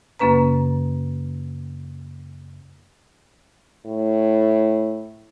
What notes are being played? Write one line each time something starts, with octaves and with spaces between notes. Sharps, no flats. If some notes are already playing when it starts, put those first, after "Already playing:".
F#2 C#3 A#3 C#4 B4 A#5
A2